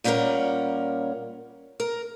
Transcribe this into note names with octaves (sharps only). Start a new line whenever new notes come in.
A#2 G3 C#4 G4 A#4 F#5
A#4